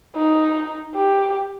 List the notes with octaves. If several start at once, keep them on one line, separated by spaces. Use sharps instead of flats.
D#4
G4